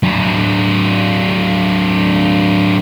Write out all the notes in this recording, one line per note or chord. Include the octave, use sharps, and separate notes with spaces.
F#3 D4